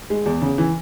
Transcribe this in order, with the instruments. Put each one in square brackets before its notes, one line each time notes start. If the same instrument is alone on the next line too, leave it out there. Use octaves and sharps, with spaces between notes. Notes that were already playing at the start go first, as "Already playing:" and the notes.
[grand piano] G#3
E2
C#3
E3